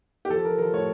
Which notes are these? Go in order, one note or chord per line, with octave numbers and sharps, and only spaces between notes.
G4
F3 A4
F3 A#4
F3 A#4
A2 C#5